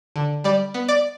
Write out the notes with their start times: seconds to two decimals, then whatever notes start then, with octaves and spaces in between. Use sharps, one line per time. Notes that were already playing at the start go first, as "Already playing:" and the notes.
0.16 D3
0.44 G3 D5
0.74 B3
0.88 D5